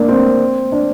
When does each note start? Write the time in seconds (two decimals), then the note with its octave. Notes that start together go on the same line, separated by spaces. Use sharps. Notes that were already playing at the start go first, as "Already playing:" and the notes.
Already playing: A#3 D4
0.08 C4
0.72 D4